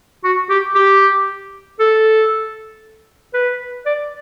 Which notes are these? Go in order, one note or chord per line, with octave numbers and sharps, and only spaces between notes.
F#4
G4
G4
A4
B4
D5